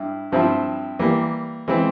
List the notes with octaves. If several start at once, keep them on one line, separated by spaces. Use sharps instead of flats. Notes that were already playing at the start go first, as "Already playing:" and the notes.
Already playing: G2 E4
G2 F3 C4 E4
E3 G3 A#3
E3 G#3 C4